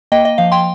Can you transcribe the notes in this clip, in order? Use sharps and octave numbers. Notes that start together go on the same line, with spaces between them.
A#3 D#5 G5
D#5
F3 F5
G5 C6